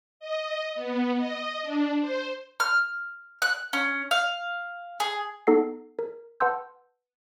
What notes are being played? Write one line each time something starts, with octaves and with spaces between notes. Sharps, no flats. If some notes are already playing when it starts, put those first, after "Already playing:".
D#5
B3
D#5
D4
C5
F6
F#6
C#4
F5
G#4
B3 D#4 A4 F#5 C7
A#4
B4 F#5 A5 C6 E6 G6